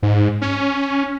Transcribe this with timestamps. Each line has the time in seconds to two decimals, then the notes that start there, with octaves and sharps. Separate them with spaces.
0.03 G#2
0.41 C#4